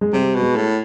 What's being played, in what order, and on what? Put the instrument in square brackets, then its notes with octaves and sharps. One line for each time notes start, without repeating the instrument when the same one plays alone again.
[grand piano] G#3
[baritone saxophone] C3 [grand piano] G3
[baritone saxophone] B2
[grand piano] G#3
[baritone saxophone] A2